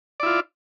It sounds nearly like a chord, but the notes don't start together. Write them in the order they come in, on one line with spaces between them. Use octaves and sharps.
D5 E4 F4